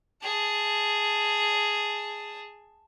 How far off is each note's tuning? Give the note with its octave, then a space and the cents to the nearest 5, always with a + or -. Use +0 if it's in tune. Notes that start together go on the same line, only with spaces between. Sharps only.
G#4 +0 A5 +0